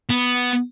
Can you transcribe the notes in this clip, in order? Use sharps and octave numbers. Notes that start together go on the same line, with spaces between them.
B3